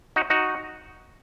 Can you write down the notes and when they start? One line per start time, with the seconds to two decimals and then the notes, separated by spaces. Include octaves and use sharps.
0.16 D#4 F#4
0.30 D#4 F#4